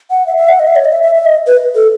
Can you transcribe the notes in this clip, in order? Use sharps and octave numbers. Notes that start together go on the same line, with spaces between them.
F#5
E5
E5
F#5
D#5
E5
C#5
D#5
E5
E5
E5
D#5
B4
A4